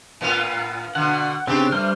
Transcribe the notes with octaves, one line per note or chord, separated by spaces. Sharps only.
A2 B3 F4
B2 D3 F#5
C#3 B3 C4 D4 G4
G3 A3 C5 F6